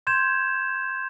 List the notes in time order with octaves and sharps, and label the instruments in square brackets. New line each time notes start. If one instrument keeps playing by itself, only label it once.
[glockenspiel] C6 G6 G#6 E7